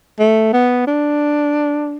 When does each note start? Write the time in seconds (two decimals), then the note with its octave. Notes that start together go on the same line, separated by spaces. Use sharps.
0.19 A3
0.53 B3
0.87 D4